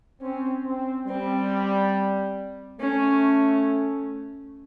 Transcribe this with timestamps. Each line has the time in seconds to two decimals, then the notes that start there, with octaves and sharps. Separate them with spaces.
0.22 C4 C#4
0.65 C4
1.07 G3 C4
2.80 A3 C#4